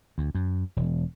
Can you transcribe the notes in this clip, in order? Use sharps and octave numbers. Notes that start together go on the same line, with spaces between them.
D2
F#2
E1